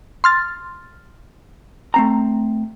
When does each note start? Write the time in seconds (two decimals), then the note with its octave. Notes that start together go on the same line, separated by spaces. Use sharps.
0.24 C6 F6 A6
1.94 A3 C4 A#5